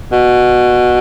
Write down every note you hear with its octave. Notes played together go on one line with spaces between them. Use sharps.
B2